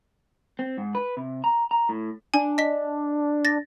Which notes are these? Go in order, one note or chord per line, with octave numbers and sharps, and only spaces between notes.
C4
G#2
B4
C3
A#5
A#5
A2
D4 G#5
D#5 B6
A6 A#6